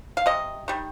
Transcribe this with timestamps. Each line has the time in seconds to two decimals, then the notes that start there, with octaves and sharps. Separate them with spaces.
0.17 F5
0.26 C3 D#5
0.68 D#3 G3